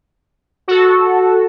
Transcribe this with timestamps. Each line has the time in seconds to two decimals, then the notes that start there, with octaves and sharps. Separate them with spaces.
0.68 F#4 A4